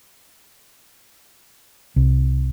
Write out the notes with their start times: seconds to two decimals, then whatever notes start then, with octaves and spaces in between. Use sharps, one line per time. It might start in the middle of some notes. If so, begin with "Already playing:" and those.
1.96 C2